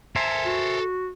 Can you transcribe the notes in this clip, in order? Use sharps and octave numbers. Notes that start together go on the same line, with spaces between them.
A4 A#4 C5 E5 G#5
F#4